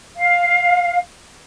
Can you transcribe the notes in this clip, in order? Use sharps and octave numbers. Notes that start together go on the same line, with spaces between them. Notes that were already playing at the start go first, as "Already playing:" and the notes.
F5